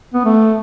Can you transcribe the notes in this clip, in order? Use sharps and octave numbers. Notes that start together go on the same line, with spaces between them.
B3
A3